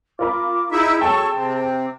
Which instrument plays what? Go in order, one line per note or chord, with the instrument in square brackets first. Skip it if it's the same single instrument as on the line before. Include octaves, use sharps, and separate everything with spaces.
[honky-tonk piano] F4 A#4 B5 [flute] D6
[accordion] D#4 E4 E5 [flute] G#4
[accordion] F#3 A4 C#6 [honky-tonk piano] G5 A5 E7
[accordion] C3 C4